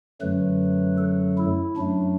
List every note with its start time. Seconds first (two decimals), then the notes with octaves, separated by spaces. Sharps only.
0.21 F#2 D3 F#3 A3 B4
0.98 A4
1.38 E4
1.76 F#2 F#3 A3 D4